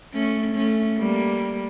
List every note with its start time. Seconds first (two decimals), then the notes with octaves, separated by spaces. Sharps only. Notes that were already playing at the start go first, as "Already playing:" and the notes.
0.14 A3 C#4
0.55 A3 C#4
0.98 G3 A#3